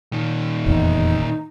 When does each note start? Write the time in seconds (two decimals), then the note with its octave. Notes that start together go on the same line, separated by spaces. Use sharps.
0.12 A#2 D#3
0.66 F1 E2 D#4